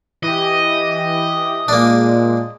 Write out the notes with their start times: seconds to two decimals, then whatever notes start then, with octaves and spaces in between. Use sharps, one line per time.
0.23 E3 G4 D#5
1.68 A#2 G#3 A#3 D4